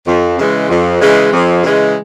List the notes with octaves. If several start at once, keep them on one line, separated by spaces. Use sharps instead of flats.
F2
C#3 E3 G#3
F2
C#3 E3 G#3
F2
C#3 E3 G#3